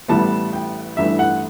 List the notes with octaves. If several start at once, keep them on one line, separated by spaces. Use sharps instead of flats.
A1 A2 G3 B3 A5
G5
A1 G2 E3 A3 E5
F#5